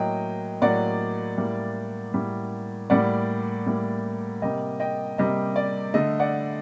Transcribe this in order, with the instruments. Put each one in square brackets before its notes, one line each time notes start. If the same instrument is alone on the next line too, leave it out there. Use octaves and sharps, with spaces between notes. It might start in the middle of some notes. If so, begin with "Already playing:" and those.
Already playing: [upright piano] A2 F#3 A#3 D#5 G5
A2 F#3 A#3 D5 F#5
A2 G3 A#3
A2 G3 A#3
A2 G3 A#3 D5 F#5
A2 G3 A#3
C3 G3 A#3 D#5 G5
D#5 G5
C3 G3 A#3 D#5
D5
D3 A3 D#5
D5 F#5